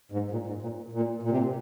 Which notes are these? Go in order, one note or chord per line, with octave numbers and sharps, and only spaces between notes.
G#2
A#2
G#2
A#2
A#2
A#2
C3
A#2